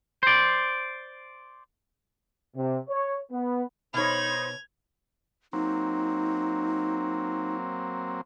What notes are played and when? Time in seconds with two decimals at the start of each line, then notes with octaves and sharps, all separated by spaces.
0.23 C5 D5
2.57 C3
2.89 C#5
3.32 B3
3.94 B2 D#4 C5 C#5 B5 G#6 F7
5.53 F#3 A#3 C4 D#4